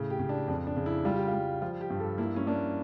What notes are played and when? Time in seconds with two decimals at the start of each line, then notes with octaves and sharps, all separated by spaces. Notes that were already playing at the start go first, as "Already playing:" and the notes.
Already playing: A2 C#3
0.10 G4
0.19 C#3
0.29 D4
0.48 F2 D4
0.67 D4
0.77 C#3
0.86 E4
1.05 G3 F4
1.16 G4
1.28 F4
1.33 G3
1.62 F3 F4
1.81 G4
1.90 G2
2.00 A4
2.18 A#3 E4
2.36 C#4
2.47 A#3 D4